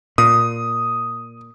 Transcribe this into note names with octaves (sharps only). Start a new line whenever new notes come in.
A#2 D#6